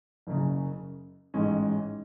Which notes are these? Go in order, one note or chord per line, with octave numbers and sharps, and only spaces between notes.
F#1 F#2 C#3
A1 G#2 G#3 C#4